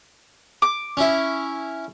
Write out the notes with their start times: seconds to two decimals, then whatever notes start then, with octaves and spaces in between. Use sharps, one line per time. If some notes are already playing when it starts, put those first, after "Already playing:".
0.62 D6
0.97 C#4 E4